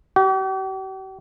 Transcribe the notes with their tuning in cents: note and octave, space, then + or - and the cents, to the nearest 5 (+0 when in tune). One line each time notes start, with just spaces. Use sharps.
G4 -45